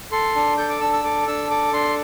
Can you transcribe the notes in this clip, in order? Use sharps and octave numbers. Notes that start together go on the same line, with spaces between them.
A4 C6
D4
A4 G6
D6
D4 E6
E6
A4 D6
D4 E6
A4 D6
D4 C6